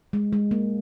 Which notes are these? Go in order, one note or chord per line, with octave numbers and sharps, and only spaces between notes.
G#3
G#3
A#3